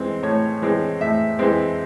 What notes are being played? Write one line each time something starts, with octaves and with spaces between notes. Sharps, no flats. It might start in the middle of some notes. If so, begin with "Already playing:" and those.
Already playing: E3 G#3 C4
A2 C#5
E3 G#3 C4
A2 E5
E3 G#3 C4